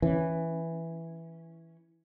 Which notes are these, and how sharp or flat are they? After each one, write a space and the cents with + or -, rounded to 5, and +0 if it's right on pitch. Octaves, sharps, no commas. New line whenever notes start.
E3 +0 C#4 -5